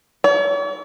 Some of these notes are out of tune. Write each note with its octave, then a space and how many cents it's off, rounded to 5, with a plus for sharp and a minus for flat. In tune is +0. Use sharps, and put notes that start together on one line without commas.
C#5 +45